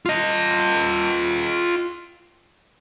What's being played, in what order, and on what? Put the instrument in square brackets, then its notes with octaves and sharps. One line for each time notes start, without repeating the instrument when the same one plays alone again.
[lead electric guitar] F4 D#5